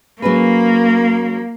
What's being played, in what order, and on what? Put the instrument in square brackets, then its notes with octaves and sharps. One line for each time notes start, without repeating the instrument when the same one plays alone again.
[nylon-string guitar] F#3 C#4 G#4 B4 [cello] A#3